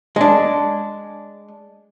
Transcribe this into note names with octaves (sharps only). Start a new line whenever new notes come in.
G#3 D4